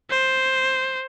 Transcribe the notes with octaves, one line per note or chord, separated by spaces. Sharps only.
C5